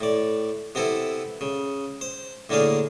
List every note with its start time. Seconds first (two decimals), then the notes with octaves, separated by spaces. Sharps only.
0.01 A2 D5
0.75 C3 B3 C4 E4 A4
1.41 C#3
2.01 C5
2.50 A2 D3 A#3 D4 G#4 F5